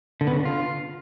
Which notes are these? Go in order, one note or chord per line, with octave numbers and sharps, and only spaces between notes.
D3
B3
C#3
D3
F4